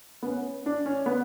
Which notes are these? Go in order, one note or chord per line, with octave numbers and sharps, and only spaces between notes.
B3
C#4
D4
C#4
B3